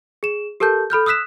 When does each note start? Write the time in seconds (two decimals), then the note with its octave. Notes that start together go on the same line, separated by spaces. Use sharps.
0.23 G#4 E7
0.60 G4 A4 A#4 A5 G6
0.90 A4 B5 F6 G6
1.06 D#6 E6 F#6 B6 E7